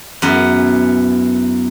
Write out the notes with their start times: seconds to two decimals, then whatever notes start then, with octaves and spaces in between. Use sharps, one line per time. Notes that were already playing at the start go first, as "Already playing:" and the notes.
0.22 F#2 E3 B3